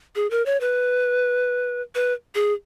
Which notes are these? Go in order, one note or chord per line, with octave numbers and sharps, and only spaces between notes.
G#4
A#4
C#5
B4
B4
G#4